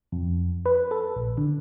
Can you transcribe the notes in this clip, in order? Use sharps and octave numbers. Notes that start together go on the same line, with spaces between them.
F2
B4
A4
A#1
D3